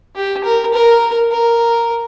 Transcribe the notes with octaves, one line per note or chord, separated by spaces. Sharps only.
G4
A#4
A#4
A#4